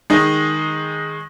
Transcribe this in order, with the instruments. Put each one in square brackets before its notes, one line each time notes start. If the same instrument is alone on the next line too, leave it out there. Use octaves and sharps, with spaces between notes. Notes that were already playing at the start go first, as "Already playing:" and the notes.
[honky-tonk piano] D#3 G#3 D#4